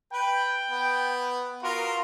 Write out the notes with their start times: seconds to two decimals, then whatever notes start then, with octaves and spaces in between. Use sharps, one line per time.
0.13 B4 G5
0.71 B3
1.63 B3 F4 F#4 A#4